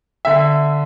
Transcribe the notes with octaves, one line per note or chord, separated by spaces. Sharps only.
D3 E5